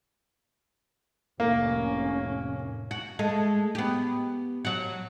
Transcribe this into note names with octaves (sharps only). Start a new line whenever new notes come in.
F1 A2 A#3 C#4
F#4
G#3 A3
B3 G4
F#3 F#4